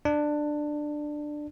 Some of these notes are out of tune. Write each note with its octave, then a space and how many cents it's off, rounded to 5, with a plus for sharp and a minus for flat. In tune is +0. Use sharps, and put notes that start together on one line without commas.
D4 +15